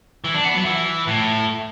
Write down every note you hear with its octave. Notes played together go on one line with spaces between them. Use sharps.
E3
D4
B3
F#3
E3
A2